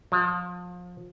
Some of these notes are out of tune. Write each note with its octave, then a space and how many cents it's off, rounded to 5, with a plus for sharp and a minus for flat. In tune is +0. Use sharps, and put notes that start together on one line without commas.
F3 +30